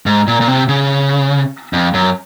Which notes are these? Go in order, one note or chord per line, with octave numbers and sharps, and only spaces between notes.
G#2
A#2
A#2
C3
C#3
F2
F#2